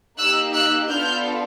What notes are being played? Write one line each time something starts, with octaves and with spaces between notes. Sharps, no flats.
A#3 D#4 G4 E6 F#6
E6 F#6
B3 D4 F4 A4 F6 G6